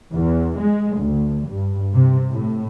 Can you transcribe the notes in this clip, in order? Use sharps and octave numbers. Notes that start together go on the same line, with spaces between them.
E2
G#3
D2
G2
C3
A2